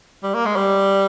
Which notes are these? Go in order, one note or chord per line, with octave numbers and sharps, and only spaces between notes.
G3
A#3
G#3
G3